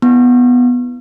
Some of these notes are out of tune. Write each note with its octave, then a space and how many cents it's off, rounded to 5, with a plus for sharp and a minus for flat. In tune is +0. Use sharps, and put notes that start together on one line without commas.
B3 +0 E4 +0